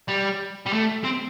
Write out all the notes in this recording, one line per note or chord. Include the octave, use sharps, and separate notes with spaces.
G3
G3
A3
C4